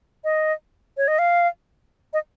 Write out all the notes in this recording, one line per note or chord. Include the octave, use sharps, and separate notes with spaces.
D#5
C#5
D#5
F5
D#5